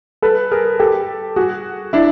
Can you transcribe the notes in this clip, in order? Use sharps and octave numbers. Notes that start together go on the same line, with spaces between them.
A4 B4
G#4 A#4
G4 A4
F#4 G#4
D4 E4